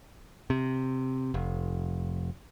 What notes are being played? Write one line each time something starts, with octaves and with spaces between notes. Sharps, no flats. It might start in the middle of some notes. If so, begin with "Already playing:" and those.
C3
F1